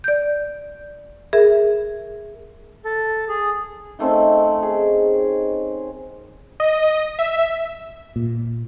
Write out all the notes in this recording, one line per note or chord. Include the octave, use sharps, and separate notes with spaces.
D5 G6
G#4 A#4 E5
A4
G#4
D#3 A3 C4 C#4
G#4
D#5
E5
A#2